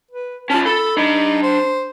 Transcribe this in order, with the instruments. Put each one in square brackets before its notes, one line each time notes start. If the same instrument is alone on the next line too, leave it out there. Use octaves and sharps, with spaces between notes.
[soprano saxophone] B4
[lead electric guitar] C#4 F4 [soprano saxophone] A5
[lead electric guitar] A4 [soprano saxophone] B5
[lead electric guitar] D4 B5 [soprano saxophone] D#4
[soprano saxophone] C5